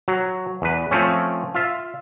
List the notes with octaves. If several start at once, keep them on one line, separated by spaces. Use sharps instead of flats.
F#3
E2 B4
F3 A3 C4 C#4
F4 E5